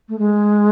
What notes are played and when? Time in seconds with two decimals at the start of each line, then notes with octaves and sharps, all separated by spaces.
0.09 A3
0.19 G#3